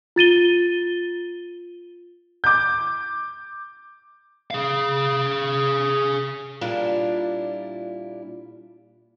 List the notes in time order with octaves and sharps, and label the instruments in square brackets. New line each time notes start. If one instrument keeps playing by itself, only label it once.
[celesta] F4 A6 D#7 G7
[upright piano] D6 G6
[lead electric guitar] G#4 F5
[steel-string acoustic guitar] A#2 G3 D4 E4 F4